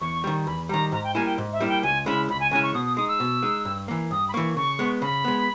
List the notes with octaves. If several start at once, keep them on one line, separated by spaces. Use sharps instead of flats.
E2 C#6
D#3 G3
E2 B5
D#3 G3 A#5
G#2 A#5
G5
G3 A#3 E4 G#5
G5
G#2
E5
G3 A#3 E4
G5
C#2 G#5
C#3 G#3 C#4 E4 B5
C#2 B5
G#5
C#3 G#3 C#4 E4 G#5
C#6
B2 D#6
D#6
G#3 D#4 D#6
E6
B2
G#3 D#4
G2
E3 A#3
G2 D#6
B5
E3 A#3 C#6
C#3 C#6
G#3 B3
C#3 B5
G#3 B3